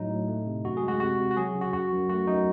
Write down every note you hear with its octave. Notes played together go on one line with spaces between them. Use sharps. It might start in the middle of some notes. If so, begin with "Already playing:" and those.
Already playing: A2 F#3 D#4
A2
A3
C3
F#2 F#4
G#4
G#3
F#4
C3 F#4
C3
F#4
F#3 G#4
C#3
F#4
F#2 F#4
F#2
A3 F#4
F#2 D#4